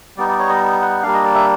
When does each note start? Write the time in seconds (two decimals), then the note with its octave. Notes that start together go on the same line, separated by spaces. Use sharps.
0.17 G3 B3 D#4 D5
0.28 D5
0.39 C#5
0.49 D#5
0.82 F#5
1.03 G3 A#3 D4 F5
1.14 D#5
1.24 D5
1.35 E5